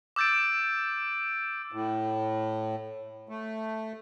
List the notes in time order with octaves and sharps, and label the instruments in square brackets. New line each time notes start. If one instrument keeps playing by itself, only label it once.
[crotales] D6 E6 G6 A6 D7
[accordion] A2
A3